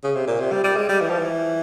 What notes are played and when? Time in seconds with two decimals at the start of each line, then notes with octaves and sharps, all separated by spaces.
0.03 C#3
0.15 C3
0.27 A#2
0.40 C3
0.52 G3
0.64 G3
0.76 G#3
0.89 G3
1.01 E3
1.10 F3
1.19 E3